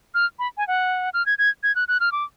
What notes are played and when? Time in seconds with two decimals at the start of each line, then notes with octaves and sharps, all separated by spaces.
0.14 F6
0.39 B5
0.57 G#5
0.68 F#5
1.14 F6
1.26 G#6
1.38 G#6
1.63 G#6
1.76 F#6
1.88 F#6
2.00 F6
2.12 D6